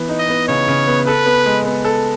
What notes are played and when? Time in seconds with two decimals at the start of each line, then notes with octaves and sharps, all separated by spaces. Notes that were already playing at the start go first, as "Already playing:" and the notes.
Already playing: E3 B3
0.09 D#4
0.19 D#5
0.29 B3
0.48 C#3 C#5
0.68 C#3
0.87 B3
1.07 A4 B4
1.26 B3
1.46 G#3
1.66 B3
1.85 A4